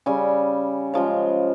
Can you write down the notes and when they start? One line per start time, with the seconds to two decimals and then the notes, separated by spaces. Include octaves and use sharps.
0.06 C#3 G3 G#5
0.94 C#3 F3 G#3